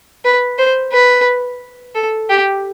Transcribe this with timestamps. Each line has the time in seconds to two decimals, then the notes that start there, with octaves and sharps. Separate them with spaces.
0.25 B4
0.58 C5
0.92 B4
1.95 A4
2.29 G4